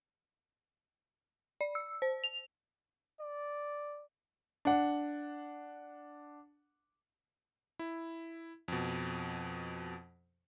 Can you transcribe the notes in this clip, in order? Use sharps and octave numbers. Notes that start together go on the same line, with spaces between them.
D5
E6
C5
F7
D5
D4 F#5
E4
F2 B2